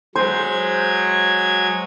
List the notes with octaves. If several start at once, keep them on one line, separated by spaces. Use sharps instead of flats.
F#3 G#3 C5 G#6